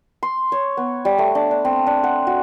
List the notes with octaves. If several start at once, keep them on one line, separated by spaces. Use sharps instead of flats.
C6
C#5
B3
G3
A3
D4
D4
C4
D4
F#5
F#4